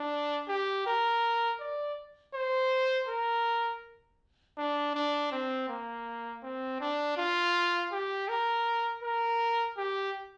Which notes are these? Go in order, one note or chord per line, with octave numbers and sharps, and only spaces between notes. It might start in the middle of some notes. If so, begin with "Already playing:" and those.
Already playing: D4
G4
A#4
D5
C5
A#4
D4
D4
C4
A#3
C4
D4
F4
G4
A#4
A#4
G4